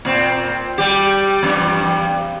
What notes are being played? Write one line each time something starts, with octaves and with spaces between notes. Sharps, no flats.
A#2 C4
G3 G4
E2 G2